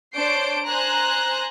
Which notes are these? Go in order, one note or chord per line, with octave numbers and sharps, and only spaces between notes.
D4 C5 C#5 G6 C7 D7
C5 G#5 A#5 F#6